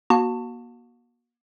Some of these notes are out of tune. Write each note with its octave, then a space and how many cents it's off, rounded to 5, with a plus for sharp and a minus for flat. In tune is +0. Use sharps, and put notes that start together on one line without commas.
A#3 +40 F#4 +0 A5 +20